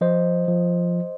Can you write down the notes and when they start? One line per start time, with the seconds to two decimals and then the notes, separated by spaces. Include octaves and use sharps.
0.01 F3 C5 D#5
0.48 F3